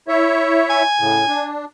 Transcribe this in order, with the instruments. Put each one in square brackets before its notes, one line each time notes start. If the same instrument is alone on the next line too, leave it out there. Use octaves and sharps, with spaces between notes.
[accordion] E4 C#5 E5
[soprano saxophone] G#5
[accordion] A2 C#3
D4